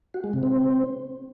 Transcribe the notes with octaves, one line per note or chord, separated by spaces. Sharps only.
F#4
G#3
C3
C4